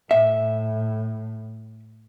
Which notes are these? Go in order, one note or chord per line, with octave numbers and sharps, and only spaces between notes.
A2 E5